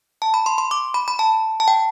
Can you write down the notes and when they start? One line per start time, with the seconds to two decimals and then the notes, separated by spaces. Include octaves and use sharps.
0.22 A5
0.34 B5
0.46 C6
0.58 C6
0.71 D6
0.94 B5
1.08 B5
1.19 A5
1.60 A5
1.68 G5